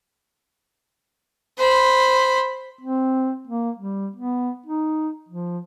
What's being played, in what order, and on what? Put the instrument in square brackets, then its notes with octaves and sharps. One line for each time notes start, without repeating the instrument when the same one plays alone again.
[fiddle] C5 B5
[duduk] C4
A#3
G3
B3
D#4
F3